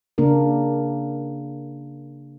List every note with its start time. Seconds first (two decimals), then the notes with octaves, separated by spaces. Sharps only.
0.18 C#3 A#3 D4 A#4